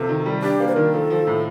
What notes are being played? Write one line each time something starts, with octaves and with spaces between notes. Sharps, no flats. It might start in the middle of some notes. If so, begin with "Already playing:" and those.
Already playing: C3 F3 A4
D#3
G3
D4 G4
A#3
C5
D#3 A#4
F3 A4
F3
A2